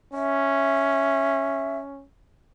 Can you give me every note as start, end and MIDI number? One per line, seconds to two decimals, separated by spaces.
0.14 2.03 61
0.14 1.78 76